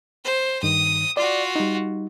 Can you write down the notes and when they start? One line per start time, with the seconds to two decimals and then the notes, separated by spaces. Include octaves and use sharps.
0.24 C5
0.63 G2 D#3 D#6
1.17 F4 F#4 D5
1.56 G3 D#4